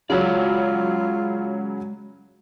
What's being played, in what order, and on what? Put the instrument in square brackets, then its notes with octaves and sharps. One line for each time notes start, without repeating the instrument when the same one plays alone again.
[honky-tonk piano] C#3 F#3 C#4 [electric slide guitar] G#3 F#4 D5 [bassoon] F4